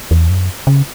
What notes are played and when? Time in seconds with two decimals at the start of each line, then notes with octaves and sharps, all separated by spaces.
0.11 E2
0.30 F#2
0.67 C#3